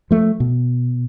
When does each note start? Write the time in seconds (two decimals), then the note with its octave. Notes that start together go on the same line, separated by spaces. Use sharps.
0.11 F3 A3
0.40 B2